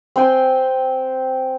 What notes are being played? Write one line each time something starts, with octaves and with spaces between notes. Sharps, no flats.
C4 C5 G5 G#5